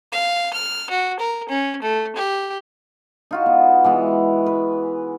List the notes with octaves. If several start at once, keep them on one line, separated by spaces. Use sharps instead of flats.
F5
F6
F#4
A#4
C#4
A3
G4
D#4 F4 F#4
B3
E3 G#3 B3
B4